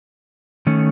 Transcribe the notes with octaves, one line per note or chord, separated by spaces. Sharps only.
D#3 A3 C#4